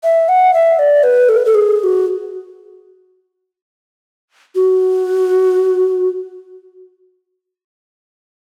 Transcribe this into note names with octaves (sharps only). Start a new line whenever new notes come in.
E5
F#5
E5
D5
B4
A4
B4
A4
G#4
G#4
F#4
F#4